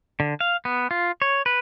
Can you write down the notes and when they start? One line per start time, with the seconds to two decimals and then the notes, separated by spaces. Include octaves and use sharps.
0.20 D3
0.40 F5
0.65 B3
0.91 F4
1.22 C#5
1.46 B4